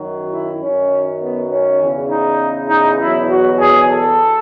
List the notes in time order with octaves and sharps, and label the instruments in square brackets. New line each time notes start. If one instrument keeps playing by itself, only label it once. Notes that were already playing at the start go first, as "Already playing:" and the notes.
Already playing: [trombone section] F#2 D#3 F#3
E4
F#2 D#3 F#3 C#4
B3
C#4
E2 C#3 E3
D#4
D#4
E2 B2 F#3 E4
F#4
G#4
A4